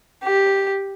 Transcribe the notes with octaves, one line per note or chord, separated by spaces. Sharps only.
G4